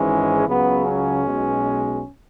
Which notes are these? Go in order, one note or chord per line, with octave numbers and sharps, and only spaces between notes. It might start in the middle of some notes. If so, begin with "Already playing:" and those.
Already playing: G#1 G#2 E3 G#3 C#4
C#2 C#3 F#3 B3
C#4
B1 B2 G#3